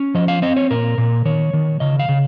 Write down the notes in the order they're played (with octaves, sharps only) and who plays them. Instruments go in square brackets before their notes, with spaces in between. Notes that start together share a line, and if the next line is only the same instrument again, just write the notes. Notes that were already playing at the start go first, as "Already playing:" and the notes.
Already playing: [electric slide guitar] C#4
F3 D#5
F5
C4 D#5
C#5
A#2 A#4
A#2
D#3 C#5
D#3
C#3 D#5
F5
C#3